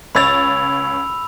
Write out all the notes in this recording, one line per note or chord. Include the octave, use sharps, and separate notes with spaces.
C#2 C#5 B5 E6 A6 F7